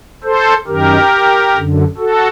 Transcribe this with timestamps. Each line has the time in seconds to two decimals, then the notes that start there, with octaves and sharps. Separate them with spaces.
0.24 A4 C5
0.67 F#2 D#3 G4 A#4
1.54 F#2 D3
1.97 F#4 A4